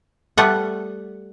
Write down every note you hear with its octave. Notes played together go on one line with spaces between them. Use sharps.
G3 A3 B3 F#5